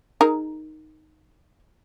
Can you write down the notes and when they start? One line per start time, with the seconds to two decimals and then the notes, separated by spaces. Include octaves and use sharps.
0.21 D#4 G#4 A#4